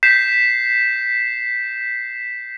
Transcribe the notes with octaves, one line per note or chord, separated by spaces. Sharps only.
G6 B6 C7 E7